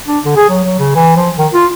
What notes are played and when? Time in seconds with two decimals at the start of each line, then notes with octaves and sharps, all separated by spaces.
0.07 D4
0.25 D3
0.36 G#4
0.49 F#3
0.64 F#3
0.79 C#3
0.95 E3
1.16 F3
1.38 D#3
1.54 F4